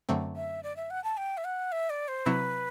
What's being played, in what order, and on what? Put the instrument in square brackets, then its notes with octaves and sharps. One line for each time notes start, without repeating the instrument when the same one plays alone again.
[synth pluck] F#2 D3 F#3 A3 C4
[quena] E5
D5
E5
F#5
A5
G5
E5
F#5
E5
D5
C5
[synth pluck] C3 F#3 C4 E4 [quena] B4